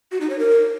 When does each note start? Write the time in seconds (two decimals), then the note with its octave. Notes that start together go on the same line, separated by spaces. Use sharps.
0.12 F#4
0.21 D#4
0.30 C#5
0.39 A#4